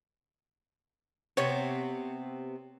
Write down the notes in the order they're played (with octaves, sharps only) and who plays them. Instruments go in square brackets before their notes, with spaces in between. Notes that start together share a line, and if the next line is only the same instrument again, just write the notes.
[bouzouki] C3 B3 C4 [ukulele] C#5